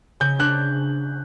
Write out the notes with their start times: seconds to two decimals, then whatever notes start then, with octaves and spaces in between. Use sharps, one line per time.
0.20 C#3 G6
0.39 D4 F#6